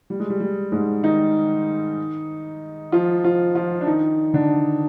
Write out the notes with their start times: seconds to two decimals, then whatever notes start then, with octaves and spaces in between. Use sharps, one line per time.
0.10 G3
0.20 G#3
0.30 G3
0.40 G3
0.72 G#2 G#3
1.03 D#3 D#4
2.92 F3 F4
3.24 F3 F4
3.55 F3 F4
3.81 D4
3.87 D#3 D#4
4.34 D3 D4